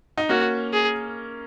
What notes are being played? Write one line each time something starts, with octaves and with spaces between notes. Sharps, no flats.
D#4
A#3 C#4 F#4
G#4